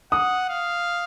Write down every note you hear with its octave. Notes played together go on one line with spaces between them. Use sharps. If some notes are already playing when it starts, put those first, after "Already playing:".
F#5 D#6
F5